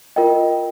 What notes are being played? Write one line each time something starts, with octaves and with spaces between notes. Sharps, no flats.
F4 A#4 D#5 G5